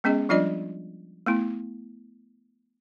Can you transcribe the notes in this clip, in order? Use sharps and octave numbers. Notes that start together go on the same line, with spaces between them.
G#3 B3 C#4 G#4 D#5
F3 G3 D4 F4 D5 D#5
A3 B3 E4